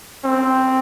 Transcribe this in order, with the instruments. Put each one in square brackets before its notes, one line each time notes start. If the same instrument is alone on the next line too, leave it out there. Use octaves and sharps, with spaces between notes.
[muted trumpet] C4